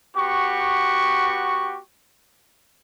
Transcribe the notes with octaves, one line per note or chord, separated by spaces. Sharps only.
B3 F#4 G4 C#6